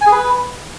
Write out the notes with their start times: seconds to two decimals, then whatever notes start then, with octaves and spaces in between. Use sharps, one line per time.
0.01 G#5
0.07 G#4
0.12 B4